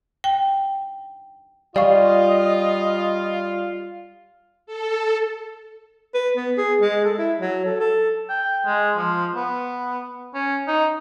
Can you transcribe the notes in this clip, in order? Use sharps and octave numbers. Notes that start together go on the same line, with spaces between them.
G5
G3 F4 D5 D#5 F5 C#6
A4
B4
B3
G#4
G#3
A4
E4
F#3
A4
A4
G5
G#3
F3
B3
C#4
D#4